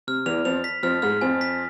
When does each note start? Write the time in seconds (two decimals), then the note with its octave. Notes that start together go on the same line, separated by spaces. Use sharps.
0.07 C3 F6
0.26 E2 E3 F7
0.45 F2 F3 F7
0.64 B6
0.83 F2 F3 F6
1.02 G#2 G#3 F6
1.21 F2 F3 G#5
1.41 B6